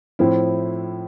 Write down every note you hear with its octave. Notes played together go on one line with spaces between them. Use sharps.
A2 F3 C4 E4